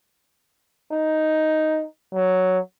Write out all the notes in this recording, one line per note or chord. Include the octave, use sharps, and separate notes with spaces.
D#4
F#3